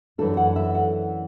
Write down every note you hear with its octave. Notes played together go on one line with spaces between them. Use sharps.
F#2 E3 A3 D4 A4
F#5
E5
F#5